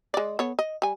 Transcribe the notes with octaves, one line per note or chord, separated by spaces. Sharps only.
G#3 D5
B3 A4 C#5
D#5
G3 G#5